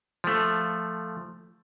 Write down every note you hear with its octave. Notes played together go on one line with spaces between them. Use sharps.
F3 A3